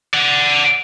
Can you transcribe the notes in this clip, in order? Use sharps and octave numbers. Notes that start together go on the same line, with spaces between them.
D5 F#5